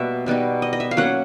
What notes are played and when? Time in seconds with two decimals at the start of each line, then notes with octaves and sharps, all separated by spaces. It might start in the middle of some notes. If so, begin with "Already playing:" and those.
Already playing: B2 G3 A#3 E5
0.26 B2 G3 B3 D#4
0.62 D#5
0.73 D#5
0.80 E5
0.91 F5
0.97 F#3 A#3 C#4 F#5